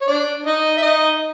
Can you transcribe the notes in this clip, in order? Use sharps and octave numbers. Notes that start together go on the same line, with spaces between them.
C#5
D4 D5
D#4 D#5
E5
D#4 D#5